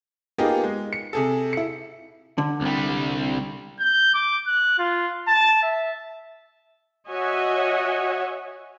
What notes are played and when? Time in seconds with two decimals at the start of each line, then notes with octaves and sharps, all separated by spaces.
0.38 A#3 B3 D#4 F4 G4 G#4
0.63 G#3
0.93 C#7
1.13 C3 G#4 A4
1.53 E4 C#7
2.38 D3
2.61 C2 G3
3.80 G6
4.15 D6
4.47 F#6
4.79 F4
5.28 A5
5.63 E5
7.08 F#4 C#5 D#5 E5 F#5 G#5